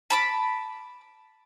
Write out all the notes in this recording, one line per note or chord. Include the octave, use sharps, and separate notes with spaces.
A5 B5 D6